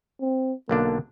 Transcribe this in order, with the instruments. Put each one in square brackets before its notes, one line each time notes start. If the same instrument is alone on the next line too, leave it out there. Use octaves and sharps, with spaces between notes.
[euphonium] C4
[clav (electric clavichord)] B1 D3 D4 [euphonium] A#3